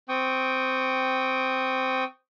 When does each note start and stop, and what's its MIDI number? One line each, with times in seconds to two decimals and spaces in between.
0.09 2.04 60
0.09 2.04 79
0.09 2.04 85
0.09 2.04 87